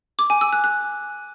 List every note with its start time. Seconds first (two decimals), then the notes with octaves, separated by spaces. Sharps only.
0.19 D6
0.30 G#5
0.41 E6
0.53 F#6
0.64 F#6